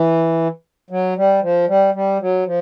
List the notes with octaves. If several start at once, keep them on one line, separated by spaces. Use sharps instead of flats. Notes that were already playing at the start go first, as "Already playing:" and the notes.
Already playing: E3
F#3
G3
F3
G3
G3
F#3
F3